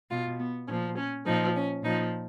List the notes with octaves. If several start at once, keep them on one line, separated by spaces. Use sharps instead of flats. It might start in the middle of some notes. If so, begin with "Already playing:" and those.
B2 F4
B3
A#2 F3 C#4
C#4
A#2 F3 D#4
C#4
A#2 F3 D#4